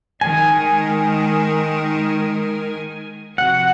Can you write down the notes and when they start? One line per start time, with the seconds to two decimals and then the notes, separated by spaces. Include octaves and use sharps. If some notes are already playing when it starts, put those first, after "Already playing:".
0.21 D#3 G#3 D#4 A#4 G#5
3.38 C3 F3 C4 F#4 F#5